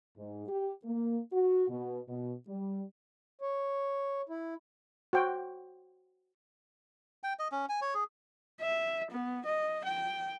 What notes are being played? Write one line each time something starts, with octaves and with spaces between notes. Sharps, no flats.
G#2
G4
A#3
F#4
B2
B2
G3
C#5
E4
F#4 C5 G5
G5
D#5
C#4
G#5
C#5
G#4
E5
B3
D#5
G5